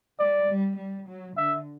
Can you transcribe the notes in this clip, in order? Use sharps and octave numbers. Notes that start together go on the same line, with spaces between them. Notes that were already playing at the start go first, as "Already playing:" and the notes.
G3 D5
G3
G3
F#3
D3 E5